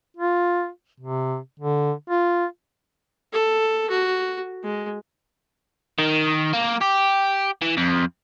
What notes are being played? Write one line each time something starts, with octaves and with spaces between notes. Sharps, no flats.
F4
C3
D3
F4
A4
F#4
G#3
D#3
A#3
G4
E3
F2